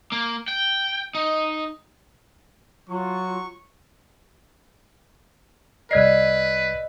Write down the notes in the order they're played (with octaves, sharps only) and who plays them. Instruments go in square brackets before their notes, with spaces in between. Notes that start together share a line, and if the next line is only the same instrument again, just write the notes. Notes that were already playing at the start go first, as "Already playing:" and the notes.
[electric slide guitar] A#3
G5
D#4
[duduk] F#3 [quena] F4 [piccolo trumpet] C#6
[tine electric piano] C2 G#6 C7 [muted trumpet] B4 [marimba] D5 [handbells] D#5 E6 F6